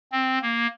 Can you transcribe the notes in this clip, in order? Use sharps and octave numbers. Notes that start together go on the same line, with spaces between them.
C4
A#3